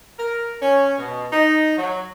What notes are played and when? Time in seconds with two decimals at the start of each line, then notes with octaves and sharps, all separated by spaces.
0.19 A#4
0.61 C#4
0.98 B2
1.32 D#4
1.77 F#3